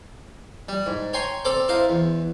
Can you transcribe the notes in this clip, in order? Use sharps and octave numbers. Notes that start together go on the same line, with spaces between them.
G3
G#2
C#5 G5 G#5 A#5 C6 C#6
C4 A4 C5 D5 A#5 D6
E4 C5 D#5 F5 A#5
E2